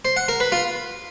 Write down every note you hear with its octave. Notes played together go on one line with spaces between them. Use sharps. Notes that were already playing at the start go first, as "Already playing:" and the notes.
C5
F#5
A#4
B4
F4